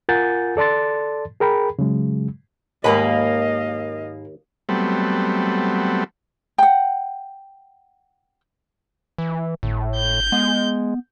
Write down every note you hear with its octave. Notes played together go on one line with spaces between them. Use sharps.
F4 A#4 F#5 G#5 G6 A6
A4 D5 A5 C6 A6
G#4 A#4 G5 B5
C#3 F#3 G#3
D#2 G#2 A#3 B4 D#5 F5
F#3 G3 A3 B3 C4
F#5 G5
E3
G#1 A2
G6
G#3 B3